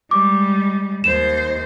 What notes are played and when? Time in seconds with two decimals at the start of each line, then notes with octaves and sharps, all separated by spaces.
0.11 G3 G#3 D6
1.04 D#2 C5 E7